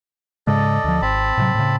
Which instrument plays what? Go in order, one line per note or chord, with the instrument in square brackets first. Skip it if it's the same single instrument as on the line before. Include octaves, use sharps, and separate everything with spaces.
[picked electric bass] G#2 C#3 G#3 [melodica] A4 D5 D#5
[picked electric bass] D2 F3
[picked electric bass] G#1 [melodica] C4 A5 B5
[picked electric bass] A2 C3 F#3
A2 C#3